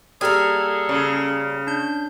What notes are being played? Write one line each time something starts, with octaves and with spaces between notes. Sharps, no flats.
G3 A#3 G#4 A4 A#5 F6 G#6
C#3
D4 G6